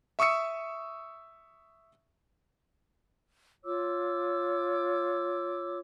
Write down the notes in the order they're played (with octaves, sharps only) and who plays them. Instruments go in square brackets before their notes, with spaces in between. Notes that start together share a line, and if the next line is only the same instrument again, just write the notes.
[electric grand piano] E5 C#6 D#6 E6 C#7
[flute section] F4 C#5 D6 E6